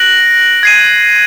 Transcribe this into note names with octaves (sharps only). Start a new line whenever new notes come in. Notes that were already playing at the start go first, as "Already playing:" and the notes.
Already playing: F#6 A#6 D7 F#7
G#6 C7 D#7